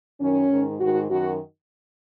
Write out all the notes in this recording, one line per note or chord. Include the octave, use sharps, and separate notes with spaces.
F#2 D#3 C#4
G#2 D#3
G#2 D#3 F#4
F#2 D#3 F#4